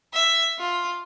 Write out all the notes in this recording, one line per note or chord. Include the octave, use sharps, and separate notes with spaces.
E5
F4